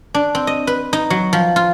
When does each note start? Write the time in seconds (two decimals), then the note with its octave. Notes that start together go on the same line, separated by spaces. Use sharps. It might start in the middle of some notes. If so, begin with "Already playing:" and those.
0.15 D4
0.35 C4
0.47 D#5
0.67 B4
0.93 D#4
1.10 F#3
1.33 F3
1.56 F4